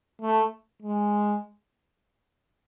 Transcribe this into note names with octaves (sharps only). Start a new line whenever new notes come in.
A3
G#3